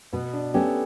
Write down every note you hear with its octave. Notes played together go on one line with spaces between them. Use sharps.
B2 B3
D4
A3 B3 C#4 G4